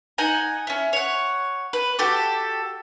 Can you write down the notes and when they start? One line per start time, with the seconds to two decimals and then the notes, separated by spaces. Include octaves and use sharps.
0.18 D#4 F#5 G#5 A#5
0.67 C#4 E4
0.93 C#5 F#5
1.73 B4
1.99 F#4 G4 A4 D6